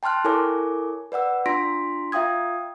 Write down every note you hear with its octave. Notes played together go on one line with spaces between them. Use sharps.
G5 A5 C6 F6 F#6
E4 A4 A#4 C#5 G#5 D6
B4 D5 F#5 E6
D4 F4 C6 A#6 B6 D7
F4 E5 F5 G5 D#6 G#6